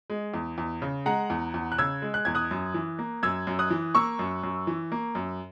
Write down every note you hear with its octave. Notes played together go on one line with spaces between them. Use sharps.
G#3
E2
E2
C#3
G#3 F#5 A#5
E2
E2
F#6
C#3 E6 G#6
G#3
F#6
E2 G#6
D#6 F#6
F#2
E3
A#3
F#2 E6 G#6
F#2
D#6 F#6
E3
A#3 C#6 E6
F#2
F#2
E3
A#3
F#2